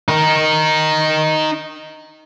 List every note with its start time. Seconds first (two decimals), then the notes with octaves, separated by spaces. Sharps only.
0.08 D#4 A#4